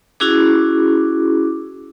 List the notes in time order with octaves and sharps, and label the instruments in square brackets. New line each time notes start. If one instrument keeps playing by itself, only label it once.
[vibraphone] C#4 E4 F#4 G#4 D6